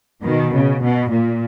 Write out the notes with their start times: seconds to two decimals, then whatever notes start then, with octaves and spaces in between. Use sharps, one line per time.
0.23 B2 D#3
0.53 C#3
0.81 B2
1.11 A#2